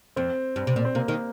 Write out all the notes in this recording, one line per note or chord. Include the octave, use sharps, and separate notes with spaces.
F2 C4
G2
C3
A#2
C4
C3 A#3
D#3